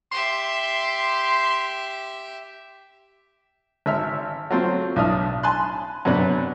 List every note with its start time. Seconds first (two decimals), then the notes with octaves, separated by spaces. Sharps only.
0.11 G4 E5 C6
3.86 G#1 E5 F6
4.50 F#3 A3 C4 F4
4.96 B1 A2 D4 E5 D#6 F6
5.43 G#5 A5 B5 C6 F#6
6.05 F#2 C3 B3 D4 B4